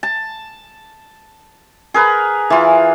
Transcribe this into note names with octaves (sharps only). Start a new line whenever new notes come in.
A5
G#4 A#4 B4
E3 F4